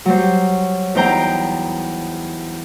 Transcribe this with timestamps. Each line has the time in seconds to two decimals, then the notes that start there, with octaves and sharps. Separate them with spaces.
0.05 F#3 G3 C5
0.95 E2 D#4 C5 G5 A#5